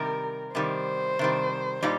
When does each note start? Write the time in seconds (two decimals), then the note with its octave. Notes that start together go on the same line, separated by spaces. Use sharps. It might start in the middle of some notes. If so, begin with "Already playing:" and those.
Already playing: C3 D#3 G3 A#4
0.55 C3 D#3 G3 C5
1.19 C3 D#3 G3
1.83 A#2 G3 D#4